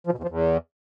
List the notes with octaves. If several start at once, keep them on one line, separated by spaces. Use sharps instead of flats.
F3
B2
E2
F3
E2